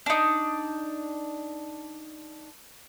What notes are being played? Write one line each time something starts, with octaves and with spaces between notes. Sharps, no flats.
D4 D#4